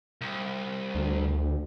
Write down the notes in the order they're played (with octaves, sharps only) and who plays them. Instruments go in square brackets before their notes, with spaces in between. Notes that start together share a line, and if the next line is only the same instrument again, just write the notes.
[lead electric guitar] C2
[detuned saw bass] D2